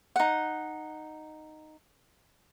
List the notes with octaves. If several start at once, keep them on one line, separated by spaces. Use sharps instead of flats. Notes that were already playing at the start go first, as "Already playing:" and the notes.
D#4 F#5